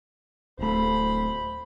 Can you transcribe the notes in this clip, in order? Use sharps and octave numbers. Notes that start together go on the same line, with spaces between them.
D1 A3 C5 B5